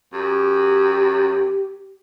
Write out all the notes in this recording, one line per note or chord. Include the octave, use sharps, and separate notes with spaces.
F#2 G4